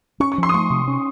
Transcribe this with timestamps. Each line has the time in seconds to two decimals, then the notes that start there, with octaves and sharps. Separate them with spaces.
0.20 C#4 C#6
0.32 C#6
0.38 F3
0.43 C6
0.49 D#6
0.54 A3 C#6
0.70 C3
0.87 C#4